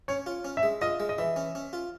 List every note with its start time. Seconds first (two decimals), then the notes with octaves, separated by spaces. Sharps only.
0.08 C#4 C#5
0.26 F4
0.45 C#4
0.57 E5
0.63 G#3
0.81 F4 D#5
1.00 G#3
1.09 D#5
1.18 E3 E5
1.36 C#4
1.55 C#4
1.73 F4